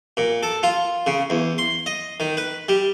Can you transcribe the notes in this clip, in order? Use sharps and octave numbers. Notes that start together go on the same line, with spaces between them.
A#2
A4
F4
C#3
E2
C6
D#5
D#3
B4
G3